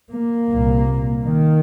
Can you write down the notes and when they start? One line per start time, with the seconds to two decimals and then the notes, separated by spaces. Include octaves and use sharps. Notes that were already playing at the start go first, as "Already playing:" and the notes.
0.12 A#3
0.48 C2 A#2
1.21 D#3